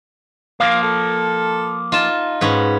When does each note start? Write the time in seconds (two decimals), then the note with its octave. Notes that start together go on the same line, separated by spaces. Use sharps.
0.60 F3 A#3 F5
0.83 A4
1.92 D#4 F4 A5
2.41 G#2 B3 C#4